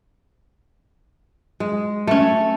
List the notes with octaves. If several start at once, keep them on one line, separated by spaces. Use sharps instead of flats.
G#3
A3 C#4